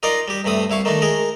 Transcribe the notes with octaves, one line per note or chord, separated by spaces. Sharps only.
D#4 F4 A#4 D5 D#5
G3 G4
G2 C3 A3 B5 D#6
C2 E4 F5 C#6
D#3 A3 D4 D#4
G#3 G#4 A#4